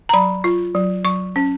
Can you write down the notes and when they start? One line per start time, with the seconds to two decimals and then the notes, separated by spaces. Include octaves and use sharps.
0.09 A#5
0.13 F#3 B5
0.44 F4
0.75 F#3
1.04 F#3 C#6
1.36 C#4